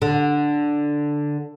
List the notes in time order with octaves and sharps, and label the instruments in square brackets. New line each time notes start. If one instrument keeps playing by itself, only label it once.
[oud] D3